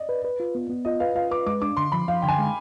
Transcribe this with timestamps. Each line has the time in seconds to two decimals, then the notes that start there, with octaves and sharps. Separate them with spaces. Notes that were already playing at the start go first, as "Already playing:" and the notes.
Already playing: D5 D#5
0.09 B4
0.25 B4
0.40 F4
0.55 B3
0.70 B3
0.85 F4 D#5
1.00 B4 F5
1.15 F4 F5
1.31 B4 D6
1.47 G#3 D6
1.62 D4 D6
1.77 D3 C6
1.92 F3 B5
2.08 F3 F5
2.22 D3 G5
2.28 G#5
2.39 G#3